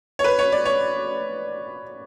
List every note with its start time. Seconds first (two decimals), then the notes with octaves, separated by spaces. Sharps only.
0.19 C#5
0.24 B4
0.39 C#5
0.52 D5
0.65 C#5